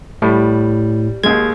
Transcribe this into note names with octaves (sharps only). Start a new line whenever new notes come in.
A2 G3
D#2 G#3 G#6